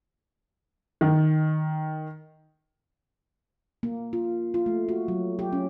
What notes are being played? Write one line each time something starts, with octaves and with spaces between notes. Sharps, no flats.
D#3
A#3
F4
F4
A3
F#4
F#3
G4
C#4